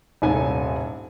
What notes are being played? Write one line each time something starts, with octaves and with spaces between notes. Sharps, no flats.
D#1 C2 G#2 A4 G#5